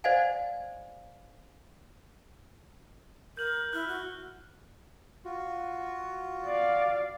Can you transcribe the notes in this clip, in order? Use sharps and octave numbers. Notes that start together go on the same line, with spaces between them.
C5 D5 D#5 F5 F#5 G#5
A#4 G6 F#7
E4 F6 F#6
F#4
F4 F#4
D5 F5